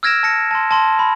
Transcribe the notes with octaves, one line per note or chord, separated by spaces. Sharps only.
E6 F6 G#6 A#6 D7 E7
A5 A#6 C#7
A5 C6
A5 C6
B5